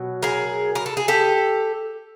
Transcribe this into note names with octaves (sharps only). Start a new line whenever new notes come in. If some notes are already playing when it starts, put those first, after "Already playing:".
Already playing: B2 F#3
G#4 A#4
A#4
A4
G#4
G4 A4